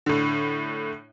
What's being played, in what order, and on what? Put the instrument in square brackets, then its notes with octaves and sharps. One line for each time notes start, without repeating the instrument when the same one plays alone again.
[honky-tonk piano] A2 D3